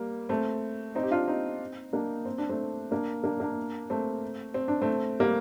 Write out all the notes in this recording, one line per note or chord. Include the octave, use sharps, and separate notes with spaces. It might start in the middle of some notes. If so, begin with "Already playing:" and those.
Already playing: G3 A#3
A3 C4
C4 D#4
G4
D4 F4
C4 D#4
A#3 D4
C4
D4
A3 C4
A#3 D4
A#3 D4
A#3 D4
A3 C4
C4
D4
A3 C4
G3 A#3